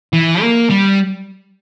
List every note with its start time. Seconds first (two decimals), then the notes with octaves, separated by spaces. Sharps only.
0.13 E3
0.41 A#3
0.70 G3